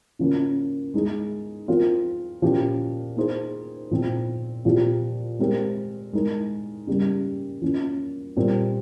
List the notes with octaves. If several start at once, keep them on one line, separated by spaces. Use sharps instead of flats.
C#3 F3 A#3 C#4
G#3 D#4 G#4
F3 C4 F4 A#4
A#2 F3 A#3 C#4 G4
A#3 D#4 G#4 C5
A#2 F3 C4
A#2 F3 C4 G4
G#3 C4 G4 A#4
G#3 D#4 A#4
C#3 G3 A#3
F3 A#3 C#4
A#2 G3 C4 G4 A#4